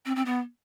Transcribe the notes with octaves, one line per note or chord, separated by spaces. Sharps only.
C4
C4
B3